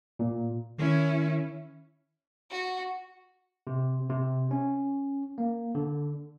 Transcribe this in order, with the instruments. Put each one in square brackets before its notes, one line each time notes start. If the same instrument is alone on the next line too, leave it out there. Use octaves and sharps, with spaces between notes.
[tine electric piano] A#2
[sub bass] D#3 [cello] C#4 E4
[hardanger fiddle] F#4
[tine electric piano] C3
C3
C#4
A#3
D3